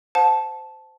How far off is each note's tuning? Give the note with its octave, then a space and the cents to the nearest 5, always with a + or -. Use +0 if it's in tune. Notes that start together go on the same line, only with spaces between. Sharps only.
C5 -15 F#5 -40 A5 -10